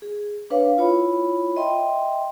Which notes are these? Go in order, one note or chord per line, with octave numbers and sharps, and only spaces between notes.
G#4
D4 B4 C#5 F5
E4 F4 C#5 B5
D#5 E5 G5 C6